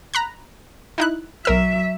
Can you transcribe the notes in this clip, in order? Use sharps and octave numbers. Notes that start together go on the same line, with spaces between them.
A#5 B5 F#6
D#4 E4 F#6
B1 F#3 A#4 E5 E6